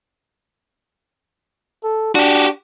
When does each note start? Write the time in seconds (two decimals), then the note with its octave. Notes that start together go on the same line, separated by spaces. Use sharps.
1.84 A4
2.15 D4 F#4 G4